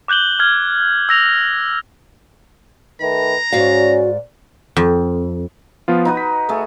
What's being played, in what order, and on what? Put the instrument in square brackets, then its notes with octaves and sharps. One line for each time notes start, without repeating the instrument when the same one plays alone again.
[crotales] D6 F#6 G6 F#7 G7
F6 G#6
E6 A#6 F7
[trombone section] D#3 A3 B4 [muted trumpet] A#5
[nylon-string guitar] G#2 D5 F5 [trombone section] C#4 [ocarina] F#4
[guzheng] F2
[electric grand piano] F3 B3 F4
[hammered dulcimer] D#4 F#4 B4
[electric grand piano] B6
[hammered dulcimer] A3 G#4